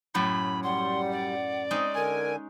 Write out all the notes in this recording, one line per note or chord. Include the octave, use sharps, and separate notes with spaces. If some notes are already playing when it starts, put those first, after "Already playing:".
F#2 A2 F#3 B5
G3 F#5 C6
D5
G#3 C4 C#4 D#4
D3 A#4 G#5